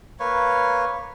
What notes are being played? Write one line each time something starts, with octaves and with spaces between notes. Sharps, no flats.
A#3 B4 C#5